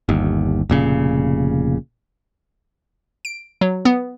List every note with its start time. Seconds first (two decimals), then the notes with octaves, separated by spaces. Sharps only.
0.09 G1 D#2
0.70 F1 A#2 C#3
3.25 D7
3.61 F#3
3.85 B3